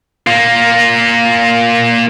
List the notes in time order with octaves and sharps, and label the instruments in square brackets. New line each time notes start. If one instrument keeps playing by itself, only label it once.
[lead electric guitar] A#3 F4